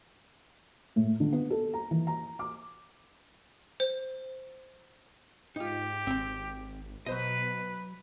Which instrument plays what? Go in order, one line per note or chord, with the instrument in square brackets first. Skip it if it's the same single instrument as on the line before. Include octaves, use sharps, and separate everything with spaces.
[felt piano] A2
D3
B3
A4
A#5
E3
A#5
D6
[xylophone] C5
[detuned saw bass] G#2 [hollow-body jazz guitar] D#4 F4 [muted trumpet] G4
[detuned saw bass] G#1 [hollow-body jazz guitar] C4 G5
[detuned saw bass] B2 [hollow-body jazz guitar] F#3 C5 D#5 [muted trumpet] B4